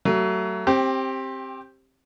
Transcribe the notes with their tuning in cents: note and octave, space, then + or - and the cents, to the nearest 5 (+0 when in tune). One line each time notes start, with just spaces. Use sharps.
F#3 +30 A3 +30
C4 +20 G4 +0